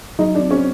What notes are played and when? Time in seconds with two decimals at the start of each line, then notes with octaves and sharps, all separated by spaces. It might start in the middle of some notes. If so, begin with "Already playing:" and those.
0.19 F#3 D#4
0.35 D4
0.40 C4
0.51 C#4